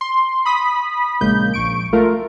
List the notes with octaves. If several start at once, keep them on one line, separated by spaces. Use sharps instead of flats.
C6
B5 D#6 B6
A#1 C#3 G#3 A#3 G6
A#1 C#6 D7
A3 F4 A#4